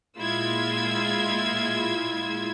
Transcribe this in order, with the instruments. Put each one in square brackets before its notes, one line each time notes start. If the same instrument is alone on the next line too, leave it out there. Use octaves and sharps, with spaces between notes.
[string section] A#2 G#3 E4 F4 E6 G#6